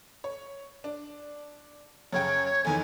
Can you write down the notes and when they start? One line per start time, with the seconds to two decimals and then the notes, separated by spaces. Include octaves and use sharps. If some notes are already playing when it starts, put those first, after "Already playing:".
0.24 C#5
0.84 D4
2.13 F#2 C#3 C#5 G5
2.65 F1 E2 D#3 G#5